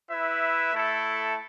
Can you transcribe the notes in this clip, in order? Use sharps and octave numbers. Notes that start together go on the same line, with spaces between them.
E4 B4 E5
A3 E4 A4